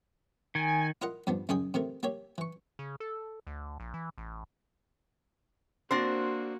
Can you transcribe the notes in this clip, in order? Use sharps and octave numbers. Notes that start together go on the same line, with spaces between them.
D#3 G#5
E4 F4 A#4 D#5 F#5
G2 F3 B3 D4
F#2 C#3 D#4 G#4 G5 D#6
C3 D#3 A3 A#4
A#3 G4 C#5 E5
E3 C#6
C#3
A4
D2
A#1
E3
A1
A#3 C4 D4 F#4 C5 C6 A#6